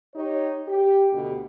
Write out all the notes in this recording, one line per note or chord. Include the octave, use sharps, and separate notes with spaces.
D#4 G4 C#5
G4
D2 B2 D3 G4